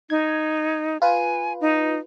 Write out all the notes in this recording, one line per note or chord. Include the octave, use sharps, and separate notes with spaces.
D#4 G#6
F4 B4 G#5
D#4